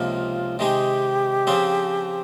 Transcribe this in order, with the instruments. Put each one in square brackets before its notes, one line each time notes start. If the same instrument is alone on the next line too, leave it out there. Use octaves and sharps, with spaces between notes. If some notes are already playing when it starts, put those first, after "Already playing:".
Already playing: [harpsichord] C#2 C3 F3 A#3 D#4 [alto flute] F4
[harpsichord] C3 D#3 G#3 D#4 G#4 [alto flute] G4
[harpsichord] C#3 F3 C4 F4 G#4